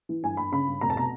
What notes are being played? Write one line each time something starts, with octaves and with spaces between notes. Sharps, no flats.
E3
G1 G#5
G1 B5
C#3 B5
G1
F1 A#5
A5
B2 A#5